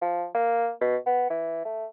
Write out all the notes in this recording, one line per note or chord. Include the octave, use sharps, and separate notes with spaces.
F3
A#3
B2
B3
E3
A3